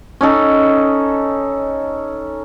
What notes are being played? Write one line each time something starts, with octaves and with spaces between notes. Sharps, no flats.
C#4 D#4 A4